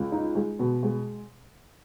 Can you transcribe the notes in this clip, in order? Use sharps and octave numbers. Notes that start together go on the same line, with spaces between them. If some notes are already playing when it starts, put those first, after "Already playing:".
Already playing: C#2
D#4
G#3
B2
G#3